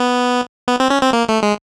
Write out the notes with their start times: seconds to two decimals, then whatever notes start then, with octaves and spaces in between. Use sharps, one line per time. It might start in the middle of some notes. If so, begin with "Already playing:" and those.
Already playing: B3
0.68 B3
0.80 C4
0.90 C#4
1.02 C4
1.13 A#3
1.29 A3
1.43 G#3